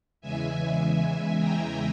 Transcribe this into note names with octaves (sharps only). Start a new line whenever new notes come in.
E2 C#3 E3 G#3 E5 G#5
G5 A#5